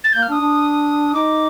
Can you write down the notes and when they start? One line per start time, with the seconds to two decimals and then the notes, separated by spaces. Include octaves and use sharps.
0.03 A6
0.12 A#3 G6
0.22 F6
0.29 D4 D#6
0.41 D4
1.14 D#4 D6